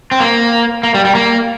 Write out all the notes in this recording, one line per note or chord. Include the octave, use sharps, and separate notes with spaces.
C4
A#3
A#3
G3
G3
A#3